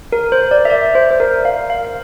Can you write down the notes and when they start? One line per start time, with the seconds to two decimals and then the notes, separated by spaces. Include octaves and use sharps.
0.12 A#4
0.32 C5
0.51 D5
0.65 E5
0.70 D5
0.95 C5
1.11 C5
1.20 A#4
1.45 F5
1.70 F5
1.85 F5